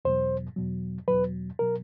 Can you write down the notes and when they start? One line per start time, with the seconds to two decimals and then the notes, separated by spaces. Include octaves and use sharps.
0.05 E2 B2 F#3 C5
0.56 E2 B2 F#3
1.08 E2 B2 F#3 B4
1.59 B2 F#3 A#4